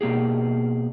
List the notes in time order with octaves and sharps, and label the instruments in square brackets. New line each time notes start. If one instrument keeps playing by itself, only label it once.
[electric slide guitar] B2 A#3 G4 G#4